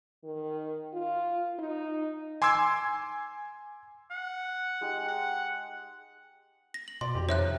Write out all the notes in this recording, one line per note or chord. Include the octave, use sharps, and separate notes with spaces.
D#3
F4
D#4
G#5 C6 D6 E6 G#6
F#5
G#3 D#4 G4
F#5
A#6
F#7
B2 D5 C6
F2 G4
C3 D#3 F3 C#5 E5 F#6